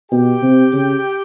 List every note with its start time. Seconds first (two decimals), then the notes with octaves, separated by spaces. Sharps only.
0.11 B2 G4 G5
0.42 C3
0.73 C#3